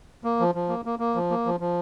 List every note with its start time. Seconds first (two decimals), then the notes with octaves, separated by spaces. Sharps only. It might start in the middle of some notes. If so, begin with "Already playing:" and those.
0.24 A#3
0.40 F3
0.55 F3
0.69 A#3
0.85 A#3
0.99 A#3
1.15 F3
1.30 A#3
1.46 F3
1.60 F3